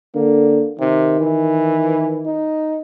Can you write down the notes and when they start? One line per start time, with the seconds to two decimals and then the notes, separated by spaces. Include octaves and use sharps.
0.15 D3 A#3
0.79 C3 D#3
1.20 E3
2.26 D#4